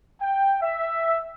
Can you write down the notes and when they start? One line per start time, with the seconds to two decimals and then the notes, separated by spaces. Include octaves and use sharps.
0.20 G5
0.62 E5